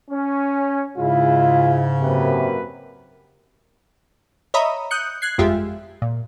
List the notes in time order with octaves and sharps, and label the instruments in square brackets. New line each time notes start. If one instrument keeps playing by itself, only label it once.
[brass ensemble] C#4
[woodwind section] G#2 C#3 [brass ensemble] G#3 E4 [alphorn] F4
[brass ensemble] F#2 A#3 B4 [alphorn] C3
[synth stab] C#5 D#5 E5 A#5 B5 D#6
D#6 F#6 G6 C#7
F#6 G#6 C7
G1 F2 G#3 F4 G4 E5
A#2